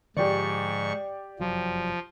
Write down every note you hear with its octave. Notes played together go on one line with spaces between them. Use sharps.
G#2 D3 F3 G#3 G4 D5 C#6
F1 F#2 F3 F#3